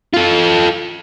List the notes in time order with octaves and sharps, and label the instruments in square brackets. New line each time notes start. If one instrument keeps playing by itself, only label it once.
[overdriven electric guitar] F4 A4